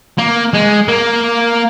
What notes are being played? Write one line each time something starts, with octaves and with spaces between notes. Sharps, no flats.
A#3
G#3
A#3